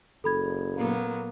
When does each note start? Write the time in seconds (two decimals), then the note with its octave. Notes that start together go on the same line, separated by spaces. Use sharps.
0.24 F#1 A4 B5 G#6
0.76 A#2 F#3 A#3 B3